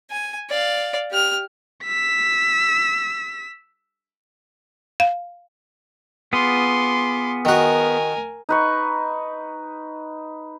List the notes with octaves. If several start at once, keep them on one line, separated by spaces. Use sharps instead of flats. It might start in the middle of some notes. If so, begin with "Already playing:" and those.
G#5
D5 F5
G4 F6
E6 B6
F5
B3 F4 G#4 C6 D6
D#3 F#4 A#4 G#5
D#4 B4 C#6